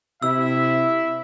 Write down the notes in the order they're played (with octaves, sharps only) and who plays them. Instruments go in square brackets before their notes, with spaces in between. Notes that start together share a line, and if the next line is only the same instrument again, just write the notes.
[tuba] C3 [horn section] E4 [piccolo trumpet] E5 [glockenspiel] E6